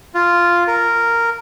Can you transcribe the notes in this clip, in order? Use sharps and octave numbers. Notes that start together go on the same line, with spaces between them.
F4
A#4